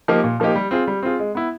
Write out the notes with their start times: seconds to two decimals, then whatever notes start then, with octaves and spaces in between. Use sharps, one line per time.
0.08 F3 A#3 D#4 G4
0.24 A#2
0.40 F3 A#3 D#4 G4
0.56 G3
0.71 C4 F4 G#4
0.87 G3
1.03 C4 F4 G#4
1.19 G#3
1.35 B3 E4